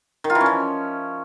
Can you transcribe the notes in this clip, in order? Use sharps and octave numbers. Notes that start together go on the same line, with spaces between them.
D#3
F4
E3
C#4
F3